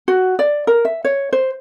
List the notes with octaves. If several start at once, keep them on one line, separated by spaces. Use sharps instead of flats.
F#4
D5
A#4
E5
C#5
C5